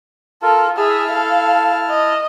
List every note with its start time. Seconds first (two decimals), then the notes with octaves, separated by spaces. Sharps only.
0.42 F4 A4 A#4
0.77 E4 G#4 E5 A5 F6
1.11 A4 F5
1.90 D#5